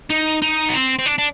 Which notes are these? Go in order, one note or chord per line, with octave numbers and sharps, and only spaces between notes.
D#4
D#4
B3
C4
C4
D4
D4